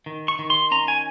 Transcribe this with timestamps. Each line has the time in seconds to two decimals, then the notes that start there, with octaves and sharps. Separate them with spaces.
0.06 D#3
0.28 C#6
0.39 D#3
0.50 C6
0.71 C#4 A#5
0.88 G#5